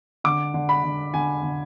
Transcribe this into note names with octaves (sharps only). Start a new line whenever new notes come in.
D3 D6
D3
B5
D3
D3 G#5
D3